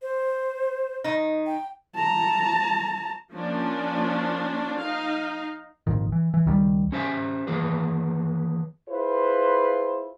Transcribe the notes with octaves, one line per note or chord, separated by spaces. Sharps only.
C5
D#3 D#4
G5
A5 A#5
F3 A#3 C#4 D4
D#4 F5
G#1 F2 A#2 D#3
E3
E3
C#2 D#3 F#3 G3
C#4 G4 C5 E5 F5 G#5
D#3 E3 A#3 G#4 B4
E4 F4 G#4 B4 C5